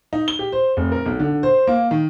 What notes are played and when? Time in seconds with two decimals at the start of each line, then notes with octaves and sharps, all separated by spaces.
0.13 D#4
0.28 G7
0.39 G4
0.52 C5
0.77 F1
0.92 A#4
1.06 B1
1.20 D3
1.43 C5
1.67 A#3
1.91 D#3